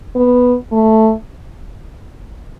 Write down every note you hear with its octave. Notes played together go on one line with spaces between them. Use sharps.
B3
A3